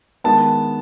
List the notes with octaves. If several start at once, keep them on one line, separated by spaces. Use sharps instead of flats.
D#3 G#3 B3 A5